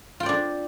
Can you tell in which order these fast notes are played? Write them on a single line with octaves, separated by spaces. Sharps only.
F4 G5 D5 D4